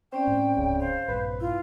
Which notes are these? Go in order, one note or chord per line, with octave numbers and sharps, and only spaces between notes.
C4 C#4 C5 D5 G5
A2
D1 C#2 G#2 C#3
C5 F5
A#1 G2 C3 B4
E4 F4